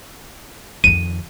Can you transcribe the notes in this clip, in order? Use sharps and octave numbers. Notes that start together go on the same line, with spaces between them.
F2 D#3 D#7